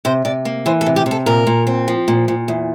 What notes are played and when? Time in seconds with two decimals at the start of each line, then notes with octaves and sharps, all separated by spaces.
0.05 C3 C5
0.25 C3 D5
0.45 A#3
0.66 E3 C5
0.81 A4
0.86 C3
0.96 G4
1.06 C3
1.11 A4
1.26 A#2 A#4
1.47 A#2
1.67 C4
1.88 F3
2.08 A#2
2.28 A#2
2.48 E2